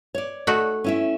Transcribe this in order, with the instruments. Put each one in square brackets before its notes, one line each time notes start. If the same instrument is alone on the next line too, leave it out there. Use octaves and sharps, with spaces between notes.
[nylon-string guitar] C#5 D5
[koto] A3 D#4 F#4
[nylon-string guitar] C#4 E4 E5